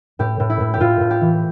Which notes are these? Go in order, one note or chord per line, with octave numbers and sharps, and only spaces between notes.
A2 G4
A2
E4
A2
G4
A2 F4
A2
G4
E3